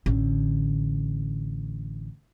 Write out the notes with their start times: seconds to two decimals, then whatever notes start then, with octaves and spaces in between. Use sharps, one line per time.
0.06 A1 D3